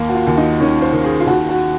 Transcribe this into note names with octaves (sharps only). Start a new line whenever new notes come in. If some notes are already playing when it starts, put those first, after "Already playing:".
Already playing: D#2 A#3
F#4
F4
D#2
D#4
D#3 C#4
C5
D#3
G#4
F4
D#2 F#4
F#4